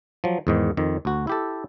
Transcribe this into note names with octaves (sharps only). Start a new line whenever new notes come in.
F3 F#3
E2 G#2 D#3
F2 D#3
D2 F#4
E4 G4 A4